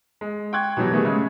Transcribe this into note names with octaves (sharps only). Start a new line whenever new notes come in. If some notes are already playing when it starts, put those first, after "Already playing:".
G#3
G5 C6 C#6 F#6 G#6
B2 E3 F#3 G3
D#3 G3 A3 B3 G#4
C#3 G#3 A3